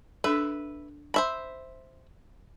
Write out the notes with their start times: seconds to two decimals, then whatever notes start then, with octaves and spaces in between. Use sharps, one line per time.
0.24 D4 A4 B4 E5
1.14 C5 E5 B5